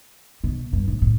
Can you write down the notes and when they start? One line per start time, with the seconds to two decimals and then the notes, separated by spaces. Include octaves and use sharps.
0.44 B2
0.73 G2
0.88 A2
1.02 A2